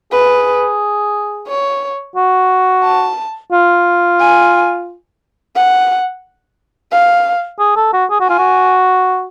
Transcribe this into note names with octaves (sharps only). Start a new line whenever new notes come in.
G#4 B4
C#5
F#4
A5
F4
G#5
F#5
F5
G#4
A4
F#4
G#4
F#4
F4 G#5
F#4